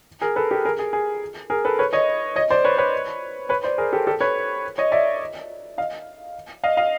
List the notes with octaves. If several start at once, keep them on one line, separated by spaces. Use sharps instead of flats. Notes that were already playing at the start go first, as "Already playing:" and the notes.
G#4 A#4
A4 B4
G4 A4
G#4 A#4
G#4
G#4
G#4 A#4
A4 B4
B4 C#5
C#5 D#5
C#5 D#5
C5 D5
B4 C#5
B4 C#5
B4 C#5
C5 D5
G#4 A#4
G4 A4
G4 A4
B4 C#5
C#5 D#5
D5 E5
D#5 F5
D#5 F5
D#5 F5